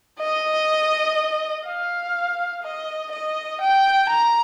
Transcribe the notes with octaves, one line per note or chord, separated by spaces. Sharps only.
D#5
F5
D#5
D#5
G5
A#5